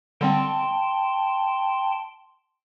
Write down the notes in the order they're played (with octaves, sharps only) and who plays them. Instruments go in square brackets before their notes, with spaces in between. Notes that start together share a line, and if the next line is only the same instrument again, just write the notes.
[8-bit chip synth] D3 G3 C4 [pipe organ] G5 A5 C6